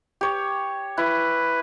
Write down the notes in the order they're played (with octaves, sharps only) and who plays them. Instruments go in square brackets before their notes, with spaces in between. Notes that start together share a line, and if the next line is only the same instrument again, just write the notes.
[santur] G4 C#5
[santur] E4 [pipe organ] B4